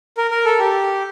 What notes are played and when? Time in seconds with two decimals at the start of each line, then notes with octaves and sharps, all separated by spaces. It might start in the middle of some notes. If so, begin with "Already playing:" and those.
0.17 A#4
0.31 A#4
0.45 A4
0.59 G4